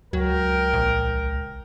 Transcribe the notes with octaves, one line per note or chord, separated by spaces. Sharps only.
C#2 F#3 A#4 G5
A#1